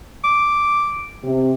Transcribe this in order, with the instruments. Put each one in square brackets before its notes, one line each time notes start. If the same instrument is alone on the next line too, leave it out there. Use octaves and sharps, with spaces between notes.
[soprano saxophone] D6
[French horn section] C3